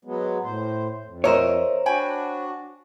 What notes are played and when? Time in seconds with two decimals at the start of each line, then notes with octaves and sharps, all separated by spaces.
0.05 F#3 G#3 B3
0.42 A2 C5
1.05 F2
1.24 A#4 C5 C#5 D#5 E5
1.86 D4 F#4 G5 G#5 B5